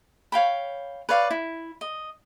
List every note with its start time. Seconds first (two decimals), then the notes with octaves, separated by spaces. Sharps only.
0.32 C#5 F5 G5 B5
1.09 B4 C#5 D5 F5
1.31 E4
1.81 D#5